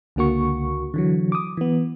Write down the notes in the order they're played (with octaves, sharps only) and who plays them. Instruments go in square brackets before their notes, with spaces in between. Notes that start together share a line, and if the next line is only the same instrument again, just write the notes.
[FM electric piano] C#2 D3 A#3 F#4 C#6
D3 E3 F#3
D6 D#6
E3 B3